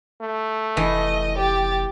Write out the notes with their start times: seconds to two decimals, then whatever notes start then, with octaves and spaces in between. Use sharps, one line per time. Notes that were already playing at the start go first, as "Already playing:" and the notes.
0.21 A3
0.77 F1 E3 D#5
1.37 G4 A6